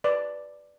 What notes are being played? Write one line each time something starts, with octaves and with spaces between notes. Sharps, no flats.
B4 D5